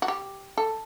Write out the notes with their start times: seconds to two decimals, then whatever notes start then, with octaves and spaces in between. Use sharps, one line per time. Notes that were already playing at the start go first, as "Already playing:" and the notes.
0.02 F#4
0.08 G4
0.58 A4